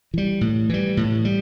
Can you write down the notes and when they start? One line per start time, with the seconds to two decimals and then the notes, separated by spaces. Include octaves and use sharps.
0.14 E3 G3
0.41 A2
0.69 E3 G3
0.97 A2
1.25 G3